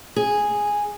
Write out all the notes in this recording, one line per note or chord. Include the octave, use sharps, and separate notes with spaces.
G#4